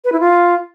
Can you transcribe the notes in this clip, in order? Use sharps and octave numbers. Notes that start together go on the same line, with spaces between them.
B4
E4
F4